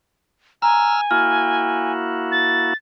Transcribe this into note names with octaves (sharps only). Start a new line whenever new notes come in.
G#5 A#5 E6 F6
A#3 E4 F#4 F6
A6